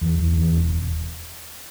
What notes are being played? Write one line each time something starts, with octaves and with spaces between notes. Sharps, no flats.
E2
E2
E2
E1
E1